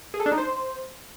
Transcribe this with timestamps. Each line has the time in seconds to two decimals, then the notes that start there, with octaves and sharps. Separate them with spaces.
0.14 G#4
0.20 A4
0.26 D4
0.32 D#4
0.38 C5